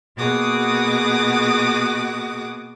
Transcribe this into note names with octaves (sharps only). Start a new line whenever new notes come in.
B2 A#3 F#4 G#4 D6 D#6